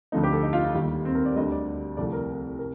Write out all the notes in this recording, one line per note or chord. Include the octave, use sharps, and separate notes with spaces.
D2 D3 F3 A3 D#4
G4
A4
D#4
F4
D#4
D#2 D#3 G3
C4
A#4
D5
D2 D3 G3 D#5
D5
C2 C3 F3 A3 D5
A#4
C3 A#4